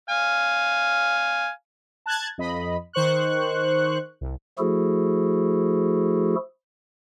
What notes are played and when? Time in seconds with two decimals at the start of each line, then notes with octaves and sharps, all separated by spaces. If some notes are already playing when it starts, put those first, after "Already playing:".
0.10 F5 G#5
2.06 A5 F#6 G#6 A6
2.38 F2 D#5 B5
2.93 D#3 C5 C#6 F#6
4.21 C2
4.59 F3 A3 E4 F#4 G#4 A4